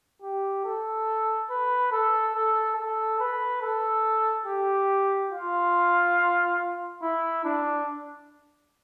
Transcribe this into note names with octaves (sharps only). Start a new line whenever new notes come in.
G4
A4
B4
A4
A4
A4
B4
A4
G4
F4
E4
D4